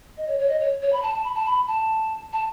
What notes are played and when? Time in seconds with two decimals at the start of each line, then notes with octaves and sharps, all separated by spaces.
0.17 D#5
0.28 C#5
0.39 C#5
0.49 D#5
0.60 C#5
0.82 C#5
0.93 B5
1.03 A5
1.14 A5
1.24 B5
1.35 A5
1.46 B5
1.68 A5
2.33 A5